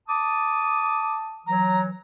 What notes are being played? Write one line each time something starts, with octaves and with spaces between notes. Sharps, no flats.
A5 D6 D#6
E3 F#3 A#5